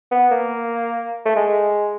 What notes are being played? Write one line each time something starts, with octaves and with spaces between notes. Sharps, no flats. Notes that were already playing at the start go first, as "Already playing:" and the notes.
B3
A#3
A3
G#3